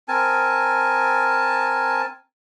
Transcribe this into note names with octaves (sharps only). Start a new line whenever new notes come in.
C4 A#4 G#5 A5